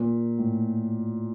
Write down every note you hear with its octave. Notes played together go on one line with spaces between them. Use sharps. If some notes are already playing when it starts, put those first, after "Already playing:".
Already playing: A#2
A2